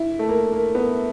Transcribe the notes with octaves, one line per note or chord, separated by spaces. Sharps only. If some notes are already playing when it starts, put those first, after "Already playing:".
Already playing: E4
A3
A#3
A#3
B3